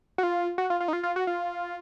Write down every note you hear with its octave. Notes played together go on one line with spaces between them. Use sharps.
F#4
F4
F#4
F4
F4
D#4
F4
F4
F#4
F4